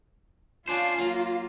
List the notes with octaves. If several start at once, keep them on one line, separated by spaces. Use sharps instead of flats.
C#4 D4 F4 C5
F#3 A#3